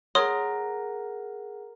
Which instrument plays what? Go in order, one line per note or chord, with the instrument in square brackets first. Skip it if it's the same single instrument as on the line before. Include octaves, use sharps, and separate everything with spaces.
[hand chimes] G#4 F#5 [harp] A#4 [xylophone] C#5 C6 D#6